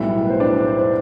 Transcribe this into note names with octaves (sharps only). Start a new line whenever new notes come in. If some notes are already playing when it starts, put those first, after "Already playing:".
Already playing: B1 A2 G3 E4 E5
B4
C5
D4 D5
C5
C5
C5